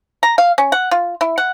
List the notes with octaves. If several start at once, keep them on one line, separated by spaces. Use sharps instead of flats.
A#5
F5
C#4
F#5
F4
E4
F#5